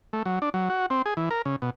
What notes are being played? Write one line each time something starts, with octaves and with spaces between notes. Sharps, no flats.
A3
F#3
D4
F#3
F#4
C4
G#4
E3
A#4
C#3
B2